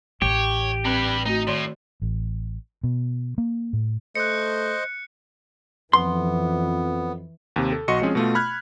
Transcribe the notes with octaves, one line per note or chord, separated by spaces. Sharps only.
A1 G4 C#5
G3 C4 B4
A3 D#4 F#4
A2 D#3 D5 C6
A1
B2
A#3
A2
A3 C5 D#5 F#6 C#7
F2 E3 B3 C6
D#2 C3
A4
B1 F#4 D#5 C6 C#6 C#7
F3 G#3 C4 C#4 G#4
B2 A3 F4
B5 F6 F#6 G#6